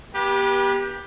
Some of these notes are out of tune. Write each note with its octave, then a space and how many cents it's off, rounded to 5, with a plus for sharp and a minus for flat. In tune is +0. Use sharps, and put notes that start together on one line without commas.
B3 -40 G4 +10 B4 -30